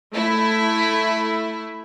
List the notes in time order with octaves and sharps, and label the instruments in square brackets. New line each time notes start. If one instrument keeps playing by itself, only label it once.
[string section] A3 E4